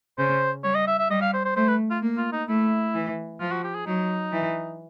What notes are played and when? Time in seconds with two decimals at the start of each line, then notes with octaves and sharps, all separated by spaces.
0.18 C#3 C5
0.64 G3 C#5
0.75 D#5
0.87 E5
0.99 E5
1.10 G3 D#5
1.22 F5
1.33 C5
1.45 C5
1.56 A3 C5
1.68 B4
1.91 F4
2.02 A#3
2.18 F4
2.33 D#4
2.48 A3 E4
2.94 E3
3.40 F3 F4
3.52 F#4
3.64 G4
3.75 G#4
3.86 F#3 D#4
4.32 E3